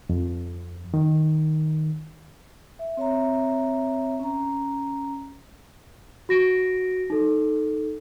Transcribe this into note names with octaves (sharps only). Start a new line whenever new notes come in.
F2
D#3
E5
C4 C#5 E5 A#5
C#4 A#5
F#4 A#6 D7
D#4 A4